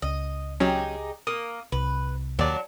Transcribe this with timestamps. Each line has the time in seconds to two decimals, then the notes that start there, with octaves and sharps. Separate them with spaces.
0.02 C#2 D#5
0.60 F#3 C#4 D#4 G4 G#4
1.27 A#3 D#6
1.72 C2 B4
2.39 D#2 F#3 D4 D5